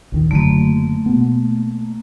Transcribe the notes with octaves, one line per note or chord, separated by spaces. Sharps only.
A#1 D#2 D#3
F#1 D3 F#3 A3 A#3
B2 B3